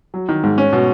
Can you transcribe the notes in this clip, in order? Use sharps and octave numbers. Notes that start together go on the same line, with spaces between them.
F#3
D#3
G#2
C#4
B2